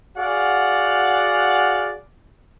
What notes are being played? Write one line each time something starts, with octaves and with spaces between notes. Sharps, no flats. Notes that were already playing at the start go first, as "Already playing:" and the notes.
F#4 G#4 D5 F5 F#5